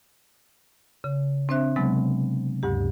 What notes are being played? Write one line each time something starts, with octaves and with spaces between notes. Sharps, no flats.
C#3
C4 D4 C5 E5 F#6
C3 F#3 G#3 B3
D2 G2 G4